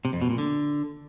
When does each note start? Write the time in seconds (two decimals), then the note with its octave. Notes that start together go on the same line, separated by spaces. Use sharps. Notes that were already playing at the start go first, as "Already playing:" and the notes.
0.05 C3
0.13 F2
0.21 B2
0.30 A#2
0.38 D3